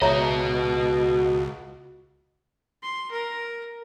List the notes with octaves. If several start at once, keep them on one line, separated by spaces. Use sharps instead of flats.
C#2 B2 F#4 C#5 D#5 E5 A#5
C6
A#4